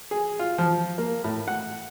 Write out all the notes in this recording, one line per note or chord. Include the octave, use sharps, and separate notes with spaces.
G#4
F4
F3
A#3
A2
F#5